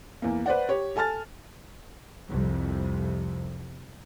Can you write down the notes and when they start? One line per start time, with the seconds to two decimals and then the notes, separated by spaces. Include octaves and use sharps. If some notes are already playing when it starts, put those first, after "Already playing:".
0.22 E2 A#3
0.46 B4 C5 D5 F#5
0.69 G4 C#5
0.96 A4 G#5 A5 F6 A6
2.29 C2 F2 C3